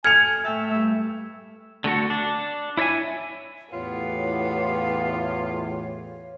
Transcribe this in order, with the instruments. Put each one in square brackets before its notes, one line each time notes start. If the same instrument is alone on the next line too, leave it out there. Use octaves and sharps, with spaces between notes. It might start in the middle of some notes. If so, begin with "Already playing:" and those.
[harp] A4 [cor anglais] G#5 [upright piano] F6 C#7 F7 [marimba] G#6
[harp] A2 G5 A5 [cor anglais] E5
[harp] G2 A3 [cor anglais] E5
[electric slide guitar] D3 A3 F#4 A4
D4
E4 C#5 D5 E5 G#5
[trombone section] E2 A2 [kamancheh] B3 G4 [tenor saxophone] F4 [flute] C#5